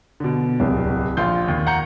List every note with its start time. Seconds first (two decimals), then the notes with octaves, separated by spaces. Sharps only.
0.20 B2 D3
0.60 D1 C2
1.17 A#1 F4 C6 G6
1.48 D#2
1.66 F#5 A#5 G6 C#7